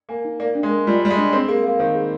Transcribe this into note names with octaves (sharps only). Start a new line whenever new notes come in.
A#3 G#5
D#4
A#3 D5
D4
G#3
A#4
G3 F4
G3 D5
G#3
D4
C4 G#4
A#3 G#4
A#3 F5
D#3 C5
G#4